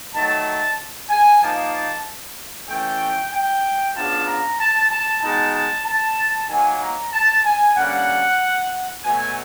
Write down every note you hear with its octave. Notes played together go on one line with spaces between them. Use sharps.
D#3 F#3 A3 A5
G#5
F3 A#3 D#4 A5
E3 A3 C#4 G5
G5
C#3 F#3 B3 D4 F4 A5
A#5
A5
A5
B2 G#3 B3 D#4 A5
A5
A5
D#3 F#3 A#3 G#5
A#5
A5
G#5
D3 G3 A#3 C#4 F#5
B2 F#3 A3 G#5